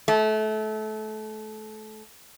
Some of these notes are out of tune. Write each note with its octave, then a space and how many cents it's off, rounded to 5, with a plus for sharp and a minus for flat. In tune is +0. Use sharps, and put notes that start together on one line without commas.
A3 -25